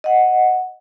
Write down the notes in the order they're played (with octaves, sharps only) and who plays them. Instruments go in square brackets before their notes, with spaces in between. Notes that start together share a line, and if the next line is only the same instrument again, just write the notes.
[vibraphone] D#5 F#5